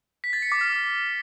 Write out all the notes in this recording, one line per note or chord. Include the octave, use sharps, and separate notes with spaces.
B6
A6
C#7
D6
F6